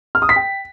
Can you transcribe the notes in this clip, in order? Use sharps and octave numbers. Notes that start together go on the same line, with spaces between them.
F6
D#6
B6
G5